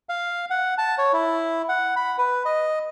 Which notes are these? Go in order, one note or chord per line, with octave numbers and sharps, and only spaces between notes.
F5
F#5
A5
C#5
E4
F#5
B5
B4
D#5